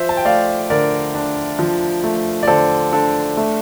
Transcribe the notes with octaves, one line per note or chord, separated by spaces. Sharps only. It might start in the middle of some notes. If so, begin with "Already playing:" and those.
Already playing: F3 C5 E5
A5
G5
A3 D5 F5
D3 A#4 D5
D4
F3
A3
D5
D3 A4 C5
D4 A4
A3